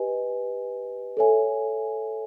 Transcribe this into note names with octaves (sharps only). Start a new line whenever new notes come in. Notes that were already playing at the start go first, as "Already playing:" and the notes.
Already playing: G4 B4 D#5 G#5
A4 C#5 E5 G#5